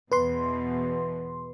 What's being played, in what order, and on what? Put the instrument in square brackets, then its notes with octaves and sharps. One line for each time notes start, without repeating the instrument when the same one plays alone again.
[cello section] E2 B2 [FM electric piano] B4 C6